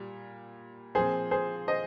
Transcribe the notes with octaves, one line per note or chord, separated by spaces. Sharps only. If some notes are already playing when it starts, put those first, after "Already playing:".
Already playing: A#2 G3
A#2 F3 C4 G#4 C5
G#4 C5
C5 D#5